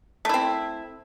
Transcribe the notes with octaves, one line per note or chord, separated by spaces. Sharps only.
A3 C4 E4